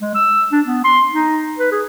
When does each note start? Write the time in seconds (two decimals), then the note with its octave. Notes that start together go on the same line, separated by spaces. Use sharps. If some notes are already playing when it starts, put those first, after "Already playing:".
0.01 G#3
0.15 E6
0.52 D4
0.66 B3
0.84 C6
1.11 D#4
1.59 B4
1.71 G#4